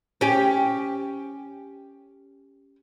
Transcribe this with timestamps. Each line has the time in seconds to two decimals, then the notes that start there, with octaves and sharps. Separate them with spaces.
0.21 C#4 G4